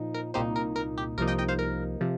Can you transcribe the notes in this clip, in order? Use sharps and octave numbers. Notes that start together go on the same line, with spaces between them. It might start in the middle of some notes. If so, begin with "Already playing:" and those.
Already playing: A#2 F3 D#4
A#4
C2 A#2 A#3 D#4 G4 C5
A#4
A#4
G4
C2 C3 F3 A#3 D#4 A#4
D#5 G5
D#5 G5
C5 F5
A#4
C3 F3